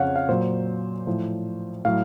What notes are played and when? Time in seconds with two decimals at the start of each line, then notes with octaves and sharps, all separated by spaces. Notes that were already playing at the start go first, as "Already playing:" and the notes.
Already playing: F2 C#3 F3 C#5 F5 F#5
0.16 F5
0.29 A#2 F#3 C5
1.07 A2 F3
1.85 A2 F#3 F5